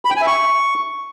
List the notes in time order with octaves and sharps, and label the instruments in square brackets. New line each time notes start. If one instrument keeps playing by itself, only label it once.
[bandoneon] B5
G5
G#5
E5
C#6